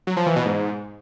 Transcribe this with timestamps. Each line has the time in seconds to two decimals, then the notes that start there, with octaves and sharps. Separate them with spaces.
0.07 F#3
0.17 F3
0.26 E3
0.36 B2
0.46 G#2